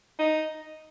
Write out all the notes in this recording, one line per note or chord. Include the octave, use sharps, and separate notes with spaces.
D#4